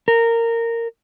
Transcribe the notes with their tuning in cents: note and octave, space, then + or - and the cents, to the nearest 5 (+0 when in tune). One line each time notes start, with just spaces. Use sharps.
A#4 -15